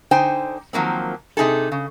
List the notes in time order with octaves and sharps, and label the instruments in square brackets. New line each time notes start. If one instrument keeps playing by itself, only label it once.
[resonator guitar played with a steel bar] D3 D#4 C5 G5 G#5
D#3 F3 F#3 A#3 C4
C3 D#4 G#4 A4
C#3